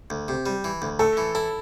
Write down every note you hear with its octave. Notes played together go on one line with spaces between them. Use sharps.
D2
C3
G3
E3
D2
A3 A4
E3
E4 A4